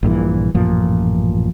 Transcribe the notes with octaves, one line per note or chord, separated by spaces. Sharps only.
A#1 G2 A#2 E3
A1 F#2 A#2 F3